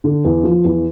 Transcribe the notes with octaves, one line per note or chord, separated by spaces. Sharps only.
D3
E2
F3
E2